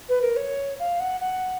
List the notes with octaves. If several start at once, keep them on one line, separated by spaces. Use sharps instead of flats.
B4
A#4
C#5
F5
F#5
F#5